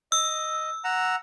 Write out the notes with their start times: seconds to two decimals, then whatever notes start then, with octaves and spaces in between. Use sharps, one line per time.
0.12 D#5 E6
0.84 F#5 A#5 E6